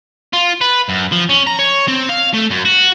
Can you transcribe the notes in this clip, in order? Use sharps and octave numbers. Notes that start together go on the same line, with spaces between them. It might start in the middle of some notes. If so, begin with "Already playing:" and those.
F4
B4
F#2
F3
C#4
A#5
C#5
C4
F5
A3
F#2
F#4